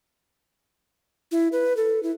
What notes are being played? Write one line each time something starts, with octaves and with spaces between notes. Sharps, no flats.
E4
B4
A4
E4